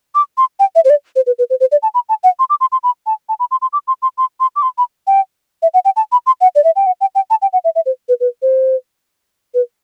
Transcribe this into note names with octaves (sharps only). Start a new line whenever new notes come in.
D6
C6
G5
E5
C5
D5
C5
B4
B4
C5
C5
D5
A5
B5
A5
F#5
C6
D6
C6
C6
B5
A5
A5
B5
C6
C6
D6
C6
C6
C6
C6
D6
C6
B5
G5
E5
F#5
G5
A5
B5
C6
F#5
D5
E5
G5
F#5
G5
G5
A5
G5
F#5
E5
E5
C5
B4
B4
C5
B4